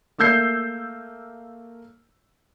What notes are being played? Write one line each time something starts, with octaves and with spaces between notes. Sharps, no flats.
A3 A#3 E6 G6 C7